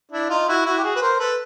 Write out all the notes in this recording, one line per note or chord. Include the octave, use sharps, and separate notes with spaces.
D4 E4
D#4 F4
E4 F#4
E4 F#4
G4
F#4 G#4
B4
A#4 C5
A4 B4